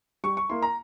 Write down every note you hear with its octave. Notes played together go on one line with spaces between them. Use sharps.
G3 C#6
C#6
A#3 E4 C6
A#5